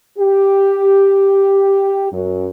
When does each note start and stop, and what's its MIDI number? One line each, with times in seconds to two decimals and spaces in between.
0.19 2.08 67
2.12 2.48 42